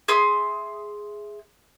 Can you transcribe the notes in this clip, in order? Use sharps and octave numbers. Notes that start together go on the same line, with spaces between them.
G#4 E5 C6 D#6